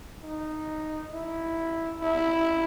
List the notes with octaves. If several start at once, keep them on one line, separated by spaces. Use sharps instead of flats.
D#4
E4
E4